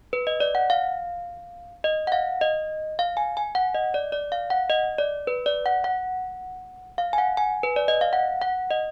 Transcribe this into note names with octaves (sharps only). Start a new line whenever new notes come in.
B4
D#5
D5
F#5
F5
D#5
F#5
F5
D#5
F5
G#5
G#5
F#5
D#5
D5
D5
F5
F#5
D#5
D5
B4
D5
F#5
F#5
F5
G#5
F#5
G#5
B4
D5
D#5
F5
F#5
F#5
D#5